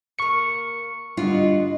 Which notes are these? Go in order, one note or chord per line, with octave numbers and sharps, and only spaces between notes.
A#3 A#4 C#6 C#7
G2 D3 F4 F#4 D#5